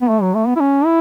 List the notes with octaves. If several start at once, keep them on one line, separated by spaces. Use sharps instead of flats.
B3
A3
F#3
A3
B3
E4
C#4
E4